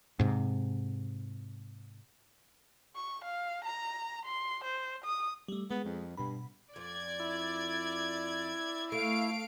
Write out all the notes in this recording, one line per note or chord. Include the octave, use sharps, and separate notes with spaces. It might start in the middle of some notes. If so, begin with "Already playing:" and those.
G#2 C3
C#6
F5
A#5
C6
C5
D#6
G3 A3
G#3 B3
F2
G2 B2 B5
F2 D5 G#6
E4
A3 F5 D7